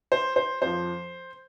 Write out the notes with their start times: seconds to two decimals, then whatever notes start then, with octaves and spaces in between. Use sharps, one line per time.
0.12 C5
0.36 C5
0.62 F2 F3 C5